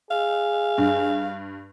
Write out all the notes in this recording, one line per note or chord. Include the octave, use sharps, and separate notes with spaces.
G#4 F5
G2